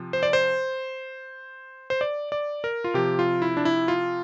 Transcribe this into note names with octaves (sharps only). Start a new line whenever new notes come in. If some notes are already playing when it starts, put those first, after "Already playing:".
Already playing: C3 F3
C5
D5
C5
C5
D5
D5
A#4
F4
C3 F3 G4
F4
E4
D4
E4
F4